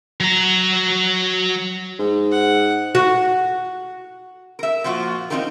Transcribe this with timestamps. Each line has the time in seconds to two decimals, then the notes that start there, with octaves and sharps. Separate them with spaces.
0.20 F#3 A#5
1.99 G#2
2.31 F#5
2.95 F#4
4.59 A#4 E5
4.84 A#2 F3 F4 F#4
5.30 C4 D4 D#4 F4 G4 A#4